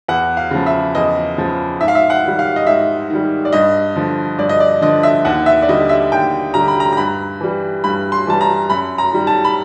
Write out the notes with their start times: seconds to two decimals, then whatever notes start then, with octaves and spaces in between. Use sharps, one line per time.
0.08 E2 F#5
0.37 F5
0.51 C#3 F3
0.66 E5
0.95 E2 D#5
1.38 C#3 F3
1.81 G#2 E5
1.88 F5
1.95 E5
2.10 F#5
2.24 D#3 G3
2.39 F5
2.56 D#5
2.67 G#2 E5
3.10 D#3 G3
3.45 D5
3.53 G2 D#5
3.96 D3 F3
4.39 G2 D5
4.49 D#5
4.60 D5
4.82 D3 F3 D#5
5.03 E5
5.25 D#2 F#5
5.46 E5
5.62 D5
5.68 D3 G3 D#5
5.89 E5
6.12 D#2 G5
6.54 D3 G3 A#5
6.68 B5
6.80 A#5
6.92 A#5
6.97 G2 B5
7.41 E3 G3
7.84 G2 B5
8.12 C6
8.27 E3 G3 A5
8.41 A#5
8.70 F#2 B5
8.98 A#5
9.12 D#3 G3
9.27 A5
9.44 B5